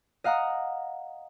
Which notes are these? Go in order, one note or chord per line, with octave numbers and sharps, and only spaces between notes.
D#5 F5 F#5 A#5 D#6